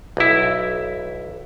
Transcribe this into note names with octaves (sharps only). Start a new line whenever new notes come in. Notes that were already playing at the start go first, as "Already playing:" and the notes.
B1 E4